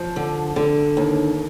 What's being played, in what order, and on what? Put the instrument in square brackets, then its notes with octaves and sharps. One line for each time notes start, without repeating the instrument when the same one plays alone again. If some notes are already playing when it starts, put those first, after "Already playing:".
Already playing: [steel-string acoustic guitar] F3
D3
D3
D#2